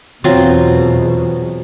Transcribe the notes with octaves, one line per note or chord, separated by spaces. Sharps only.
E2 B2 F#3 C4 F4